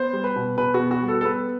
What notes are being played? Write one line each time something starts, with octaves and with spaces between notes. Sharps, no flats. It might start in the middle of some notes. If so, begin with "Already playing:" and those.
Already playing: B3 C5
G3
B4
B2
B2 B4
F#4
B3
F#4
G3
A4
A4
B3 B4